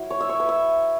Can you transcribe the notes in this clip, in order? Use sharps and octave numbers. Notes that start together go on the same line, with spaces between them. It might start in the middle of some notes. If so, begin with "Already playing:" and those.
Already playing: F#3 E4
C#5
E5
C#5
B4
E5